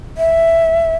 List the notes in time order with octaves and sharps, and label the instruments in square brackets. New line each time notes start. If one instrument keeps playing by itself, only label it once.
[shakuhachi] E5